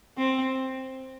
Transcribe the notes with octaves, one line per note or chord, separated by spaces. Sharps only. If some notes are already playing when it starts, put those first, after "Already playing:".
C4